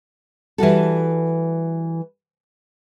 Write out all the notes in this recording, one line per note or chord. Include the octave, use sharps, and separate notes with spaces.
E3 G3 F#4 A4